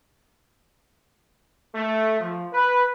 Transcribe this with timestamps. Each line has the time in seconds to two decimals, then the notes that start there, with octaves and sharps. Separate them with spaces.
1.74 A3
2.19 F3
2.52 B4